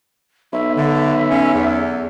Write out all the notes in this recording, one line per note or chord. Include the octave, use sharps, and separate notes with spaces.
B1 E5
D3 E5
C#4
E2